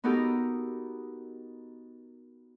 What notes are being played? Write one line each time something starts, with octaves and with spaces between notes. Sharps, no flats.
B3 D#4 F#4 G4 A4 A#4